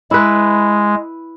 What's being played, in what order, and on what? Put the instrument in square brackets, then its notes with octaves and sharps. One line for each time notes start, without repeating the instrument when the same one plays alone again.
[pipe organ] G#3 [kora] E4 B4